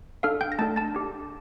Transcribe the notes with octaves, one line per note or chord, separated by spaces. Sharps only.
D4 A4 F5 F6
G5 G6
A#6
A3 D4 A4 A5 A6
A5 A6
D4 G4